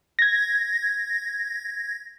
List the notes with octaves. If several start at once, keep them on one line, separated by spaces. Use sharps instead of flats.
G#6 A#6